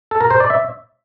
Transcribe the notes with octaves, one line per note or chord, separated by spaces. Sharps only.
A4
A#4
C5
D5
E5